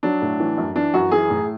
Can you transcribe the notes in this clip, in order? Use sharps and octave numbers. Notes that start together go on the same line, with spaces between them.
F#3 D4
A2
E3
F#2
E3 D4
F#2 F#4
E3 G#4
A2